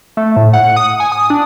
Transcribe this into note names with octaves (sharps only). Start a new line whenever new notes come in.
A3
A2
F#5
D#6
G#5
D#6
D4